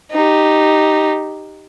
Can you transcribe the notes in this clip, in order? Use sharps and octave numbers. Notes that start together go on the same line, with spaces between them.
D#4 G4